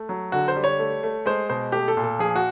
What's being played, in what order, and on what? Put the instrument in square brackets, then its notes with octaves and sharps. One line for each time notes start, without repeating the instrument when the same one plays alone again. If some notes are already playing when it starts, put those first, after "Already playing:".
Already playing: [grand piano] A3
F#3
D3 F#4
C5
G3
C#5
A3
A3
G#3 C5
B2 C5
A3 G4
A4
A#2
A4
F3 G#4
F#4